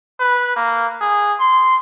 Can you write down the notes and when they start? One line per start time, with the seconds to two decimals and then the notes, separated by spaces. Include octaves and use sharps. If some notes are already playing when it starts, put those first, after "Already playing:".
0.20 B4
0.57 A#3
1.01 G#4
1.40 C6